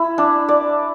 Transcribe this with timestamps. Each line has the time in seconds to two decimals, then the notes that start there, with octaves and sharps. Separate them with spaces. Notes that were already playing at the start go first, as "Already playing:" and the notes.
Already playing: E4 E5
0.18 D4
0.49 D5